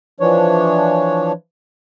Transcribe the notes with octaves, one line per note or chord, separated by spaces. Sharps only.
E3 F3 D4 C#5